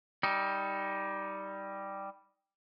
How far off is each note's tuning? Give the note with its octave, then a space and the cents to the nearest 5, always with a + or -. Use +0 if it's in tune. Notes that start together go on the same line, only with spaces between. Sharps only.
G3 +0 D#4 +20